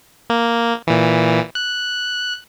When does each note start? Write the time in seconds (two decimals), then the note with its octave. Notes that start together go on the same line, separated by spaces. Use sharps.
0.30 A#3
0.87 A#2 E3
1.55 F#6